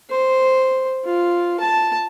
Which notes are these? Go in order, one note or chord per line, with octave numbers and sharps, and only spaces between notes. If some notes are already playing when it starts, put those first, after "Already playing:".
C5
F4
A5